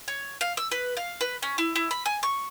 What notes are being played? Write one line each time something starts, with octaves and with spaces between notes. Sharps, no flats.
C#5
F5
E6
B4
F5
B4
C#4
E4
E4
B5
G#5
C#6